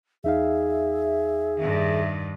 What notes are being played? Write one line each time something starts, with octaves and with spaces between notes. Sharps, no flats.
E2 D#4 G#4 E5 F5
G2 D#3